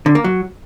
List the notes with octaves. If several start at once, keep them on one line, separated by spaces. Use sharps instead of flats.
D3
A#3
F#3